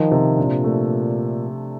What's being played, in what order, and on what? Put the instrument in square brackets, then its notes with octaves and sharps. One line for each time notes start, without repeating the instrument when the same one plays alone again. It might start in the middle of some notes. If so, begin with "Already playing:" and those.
Already playing: [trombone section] D#3 [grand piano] F3
[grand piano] C3
[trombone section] A#2 [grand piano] D4
[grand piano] A3